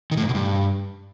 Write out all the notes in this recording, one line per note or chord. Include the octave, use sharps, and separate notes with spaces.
D#3
A2
G#2
B2
G2